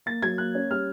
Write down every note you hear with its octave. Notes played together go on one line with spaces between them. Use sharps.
A#3 A6
F#3 G#6
A#3 F#6
C#4
G3 F6